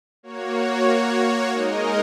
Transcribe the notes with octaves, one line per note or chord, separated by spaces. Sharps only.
A#3 F#4 C#5
G#3 D#4 A#4 D#5